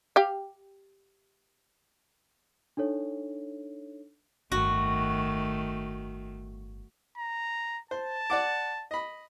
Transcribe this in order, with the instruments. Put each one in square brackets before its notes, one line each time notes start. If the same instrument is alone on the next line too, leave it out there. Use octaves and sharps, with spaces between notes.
[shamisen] G4 F5
[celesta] D4 D#4 A4 C#5
[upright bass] G1 A2 [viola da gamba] D#3 A3 [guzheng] F#4
[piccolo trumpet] A#5
[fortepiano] C5 [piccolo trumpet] A5
[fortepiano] D5 F#5 D6
D#5 B5